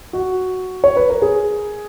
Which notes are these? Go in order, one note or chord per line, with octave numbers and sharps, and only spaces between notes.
F#4
C#5
B4
A#4
G#4